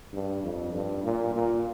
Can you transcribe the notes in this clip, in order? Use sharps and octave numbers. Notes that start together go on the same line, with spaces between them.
G2
F2
G2
A#2
A#2